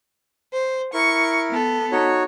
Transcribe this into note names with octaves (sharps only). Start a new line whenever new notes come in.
C5
E4 A#4 C#6
B3 A4
D#4 F#4 C#5